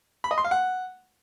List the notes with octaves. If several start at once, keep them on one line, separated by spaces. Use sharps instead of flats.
B5
D#5
C6
F5
F#5